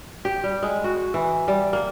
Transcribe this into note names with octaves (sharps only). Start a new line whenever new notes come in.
G4
G3
G#3
F#4
E3
G3
A#3